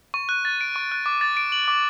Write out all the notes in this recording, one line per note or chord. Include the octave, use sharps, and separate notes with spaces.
C#6
F#6
A6
D7
C#6
F#6
D6
A6
D7
F#7
D6